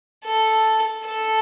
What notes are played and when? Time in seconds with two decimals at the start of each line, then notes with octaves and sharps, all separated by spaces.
0.25 A4
1.05 A4